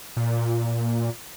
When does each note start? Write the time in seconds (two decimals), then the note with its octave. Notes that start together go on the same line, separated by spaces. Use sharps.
0.17 A#2